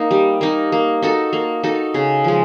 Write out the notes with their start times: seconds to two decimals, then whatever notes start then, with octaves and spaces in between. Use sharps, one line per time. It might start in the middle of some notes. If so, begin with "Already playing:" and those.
Already playing: A#3 D#4
0.11 G3
0.41 A#3 D#4
0.72 A#3
1.02 D#4 F#4 A4
1.33 A#3
1.63 D#4 F#4 A4
1.94 C#3
2.24 F3 G#3